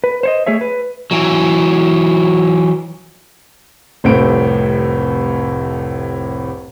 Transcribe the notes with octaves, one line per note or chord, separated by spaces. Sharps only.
B4
C5 C#5 D#5
A3 G#4 C#5 E5
B4
E3 F#3
F1 C2 A2 A4 C5 D7